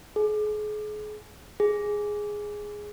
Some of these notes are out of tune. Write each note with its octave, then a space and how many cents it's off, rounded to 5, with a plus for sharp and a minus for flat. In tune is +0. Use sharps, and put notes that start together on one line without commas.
G#4 +35
G#4 +0